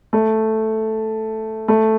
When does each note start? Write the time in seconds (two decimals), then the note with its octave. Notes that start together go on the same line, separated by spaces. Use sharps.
0.13 A3
1.68 A3